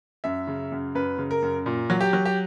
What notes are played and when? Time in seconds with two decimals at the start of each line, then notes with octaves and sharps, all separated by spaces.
0.24 F#2 E5
0.47 C#3
0.72 F#2
0.95 F#2 B4
1.18 C#3
1.31 A#4
1.42 F#2
1.66 A#2
1.90 F#3
2.01 G4
2.13 F#3
2.25 G4